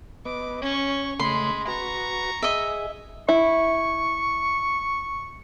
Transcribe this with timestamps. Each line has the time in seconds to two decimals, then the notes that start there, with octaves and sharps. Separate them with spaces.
0.25 B3 B4 D#5 D6
0.62 C#4 C#5 C#6
1.19 C#3 G#3 A3 B5 C6
1.67 F#4 B4 A#5 C#6
2.42 G#4 D#5 E5
3.29 E4 C#6